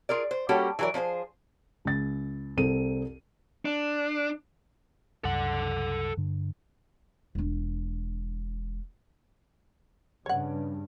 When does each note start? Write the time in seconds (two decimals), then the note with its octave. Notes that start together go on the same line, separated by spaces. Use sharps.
0.09 F4 G#4 A#4 D5
0.31 C5
0.49 G3 A#3 C#4 F#4 G4 A4
0.79 E3 F#3 A4 A#4 D5
0.94 F3 D4 G#4 C5
1.85 C#2 A6
2.57 C2 C4 A4 D#7
3.65 D4
5.24 C2 F#2 A4 F#5
6.17 G2 D3 D4
7.35 E1 D4
10.26 G2 C#3 C#5 F#5